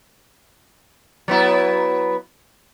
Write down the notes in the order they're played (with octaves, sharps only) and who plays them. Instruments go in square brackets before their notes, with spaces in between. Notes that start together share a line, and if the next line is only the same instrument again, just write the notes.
[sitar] F#3 B3 E4